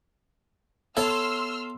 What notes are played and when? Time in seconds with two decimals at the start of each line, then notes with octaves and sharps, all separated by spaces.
0.97 B3 A4 C#5 E5 C6 E6 F6